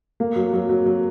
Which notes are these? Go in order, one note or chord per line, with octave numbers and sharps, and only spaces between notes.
A#3
F#3
F#3
F#3
F#3